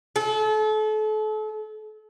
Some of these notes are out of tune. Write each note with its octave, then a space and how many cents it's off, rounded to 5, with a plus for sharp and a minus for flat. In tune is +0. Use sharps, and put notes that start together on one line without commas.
A4 -35